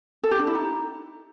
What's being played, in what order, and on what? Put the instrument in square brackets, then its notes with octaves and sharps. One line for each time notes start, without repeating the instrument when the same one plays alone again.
[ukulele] A4
G4
D4
E4
D#4